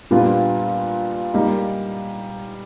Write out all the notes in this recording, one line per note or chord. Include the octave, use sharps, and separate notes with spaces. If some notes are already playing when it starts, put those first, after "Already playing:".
A#2 G3 B3 D4 F4
G3 A#3 D#4